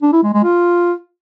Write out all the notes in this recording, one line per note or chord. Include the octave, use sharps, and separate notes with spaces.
D4
E4
G#3
G#3
F4